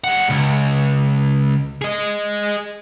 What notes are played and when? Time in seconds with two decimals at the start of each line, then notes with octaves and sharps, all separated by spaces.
0.04 G3 F#5
0.30 C#2
1.82 G#4 D#5